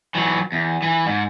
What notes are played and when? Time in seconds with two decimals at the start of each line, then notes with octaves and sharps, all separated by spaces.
0.15 E3 F#3
0.52 E2
0.82 E3
1.06 G#2